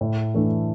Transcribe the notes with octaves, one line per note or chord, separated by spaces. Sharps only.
A2
E3 A3 D4